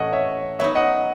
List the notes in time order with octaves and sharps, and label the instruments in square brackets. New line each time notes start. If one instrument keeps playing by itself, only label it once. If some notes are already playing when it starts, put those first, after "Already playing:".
Already playing: [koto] A2 E3 A3 C#4 [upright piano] D#5 F#5
[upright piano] C#5 E5
[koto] F#3 B3 D#4 [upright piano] C#5 E5
[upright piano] D#5 F#5